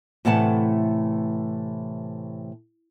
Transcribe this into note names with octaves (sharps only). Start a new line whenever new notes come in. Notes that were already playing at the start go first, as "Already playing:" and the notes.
A2 C3 E3 A3 F#5 A5